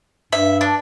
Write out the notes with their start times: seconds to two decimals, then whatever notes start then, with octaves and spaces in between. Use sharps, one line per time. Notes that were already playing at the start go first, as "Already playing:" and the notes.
0.33 G2 E5
0.61 D4